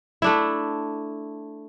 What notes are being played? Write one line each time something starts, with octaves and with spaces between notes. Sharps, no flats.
A3 D4 E4